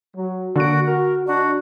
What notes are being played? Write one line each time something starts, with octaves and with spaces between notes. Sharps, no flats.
F#3
D3 A#3 F#4 D7
F#4 A#4
D4 D#4 F#4